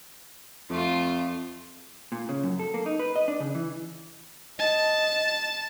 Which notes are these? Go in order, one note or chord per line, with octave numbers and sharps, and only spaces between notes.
F2 A3 F4
A#2
C#3
F#2
A4
A#3
D#4
B4
D#5
D4
C#3
E3
D#5 A5